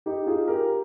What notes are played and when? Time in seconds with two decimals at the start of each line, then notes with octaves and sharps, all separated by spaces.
0.06 D#4 G4
0.27 F4 G#4
0.48 G4 A#4